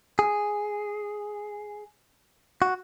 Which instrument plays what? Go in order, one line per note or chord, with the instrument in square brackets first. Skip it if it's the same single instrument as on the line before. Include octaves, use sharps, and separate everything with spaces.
[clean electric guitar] G#4
F#4